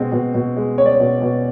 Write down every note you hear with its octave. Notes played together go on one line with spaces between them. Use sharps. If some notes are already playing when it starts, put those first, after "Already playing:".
Already playing: B2 G#3 C4
B2
B2
G#3
C4 C#5
D5
C#5
B2
B2